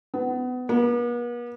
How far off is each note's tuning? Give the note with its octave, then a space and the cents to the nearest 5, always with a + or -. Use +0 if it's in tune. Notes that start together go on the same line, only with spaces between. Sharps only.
B3 +25
B3 -45